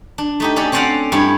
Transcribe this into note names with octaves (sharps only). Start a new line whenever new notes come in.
D4
A3 D#4 G4
C#4 D4 G4 A4
C4 C#4 C5 D5 F5 F#5
G2 E4 G4 C#5